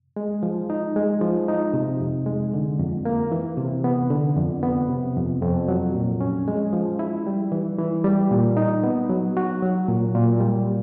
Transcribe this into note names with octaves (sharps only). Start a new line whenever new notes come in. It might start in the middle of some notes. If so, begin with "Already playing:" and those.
G#3
F3
D#4
G#3
F3
D#4
C3
F2
G#3
D3
F2
A#3
E3
C3
B3
D3
F2
B3
C3
F2
F2
F#3
A#2
C#4
G#3
F3
E4
G3
E3
E3
G3
A#2
D#4
B3
F#3
F#4
F#3
A#2
A#2
G3